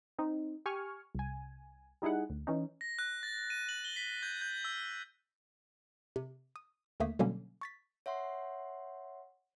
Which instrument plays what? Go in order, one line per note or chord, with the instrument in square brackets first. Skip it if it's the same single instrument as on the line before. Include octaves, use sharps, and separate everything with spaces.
[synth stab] C4 D#4
G4 G#5 C#6 F6
C2 G#5
G3 D#4 E4 G#4 F#5
D2
E3 C#4 D#4
[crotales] A#6
F#6
A6
D#7
F#7
G7
B6
G6
G6
E6
[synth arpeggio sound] C3
D#6
D#2 D3 A3 A#3 D#6 B6
B2 D3 F#3 G3 A#3 C#4
C#6 A6 B6
[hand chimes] C#5 E5 F#5 C6